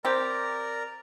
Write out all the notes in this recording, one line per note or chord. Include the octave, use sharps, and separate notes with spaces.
C4 G4 A#4 D5 A#5